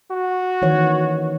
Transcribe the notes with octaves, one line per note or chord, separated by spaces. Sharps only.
F#4
D#3 E3 C#5